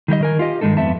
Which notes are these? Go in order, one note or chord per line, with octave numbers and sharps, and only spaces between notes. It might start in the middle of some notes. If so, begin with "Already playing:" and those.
D#3 G3 G4 D#5
D#3 A#4 G#5
F4 G4 D#5
G2 D#3 G#3 D#4 A4
F2 B3 E5 A5